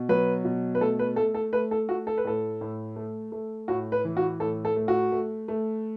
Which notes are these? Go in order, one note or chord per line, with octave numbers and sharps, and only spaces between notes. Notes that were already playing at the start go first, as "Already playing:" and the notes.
Already playing: B2
F#3 B4
B2
B4
A3 A4
B4
A3 A4
A4
A3 B4
A4
A3 F#4
A4
B4
A2 A4
A2
A3
A3
A2 F#4
B4
E3
F#4
A2 A4
A4
A3
F#4
A3
A3